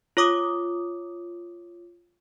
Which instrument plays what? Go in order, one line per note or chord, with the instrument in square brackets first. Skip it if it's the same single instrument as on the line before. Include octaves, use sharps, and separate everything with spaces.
[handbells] F4 C#5 D6 D#6